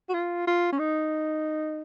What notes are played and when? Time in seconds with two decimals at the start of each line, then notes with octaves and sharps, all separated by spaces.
0.09 F#4
0.14 F4
0.47 F4
0.72 C#4
0.79 D#4